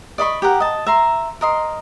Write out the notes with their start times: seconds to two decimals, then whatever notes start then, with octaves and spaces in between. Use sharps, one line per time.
0.18 D5 D#5 B5 C#6
0.42 G4 A#4 F#5
0.60 D#5 A5
0.86 E5 A#5 C6
1.41 A#4 D#5 C6